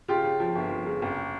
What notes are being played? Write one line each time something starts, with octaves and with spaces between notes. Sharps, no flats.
C#3 F4 G4
C#3
F3
G1
F3
C#3
F#1